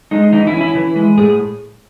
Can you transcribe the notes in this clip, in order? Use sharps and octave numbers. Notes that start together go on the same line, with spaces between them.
G#3 D#4
E3 D#4
E4
C#4
E4
E3
G#3
A2 G#4